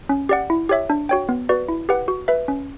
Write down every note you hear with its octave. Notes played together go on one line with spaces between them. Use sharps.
C#4
G4 D5 F#5
E4
G4 C#5 E5
D4
F#4 C#5 G5
B3
F#4 B4 D5
E4
G4 B4 F#5
F#4
B4 E5
C#4